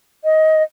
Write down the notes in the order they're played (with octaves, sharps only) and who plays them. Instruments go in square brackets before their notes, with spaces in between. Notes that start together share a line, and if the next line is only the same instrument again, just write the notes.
[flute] D#5